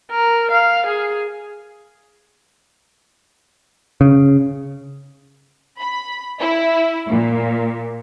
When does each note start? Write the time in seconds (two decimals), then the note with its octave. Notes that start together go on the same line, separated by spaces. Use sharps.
0.11 A#4
0.51 F5
0.86 G#4
4.01 C#3
5.79 B5
6.39 E4
7.09 A#2